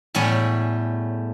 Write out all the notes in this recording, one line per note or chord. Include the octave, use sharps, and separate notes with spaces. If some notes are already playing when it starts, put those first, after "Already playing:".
E2 A2 G3 C#5 G#5